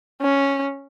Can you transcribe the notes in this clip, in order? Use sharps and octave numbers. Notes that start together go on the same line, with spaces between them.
C#4